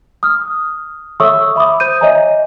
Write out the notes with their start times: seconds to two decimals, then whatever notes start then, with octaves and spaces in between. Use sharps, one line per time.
0.23 D#6 F6
1.20 A4 C#5 E5 C#6 D#6 E6
1.56 E5 B5 D6 D#6
1.80 C5 G6 D#7
2.01 C#5 D#5 E5 G#5 A#5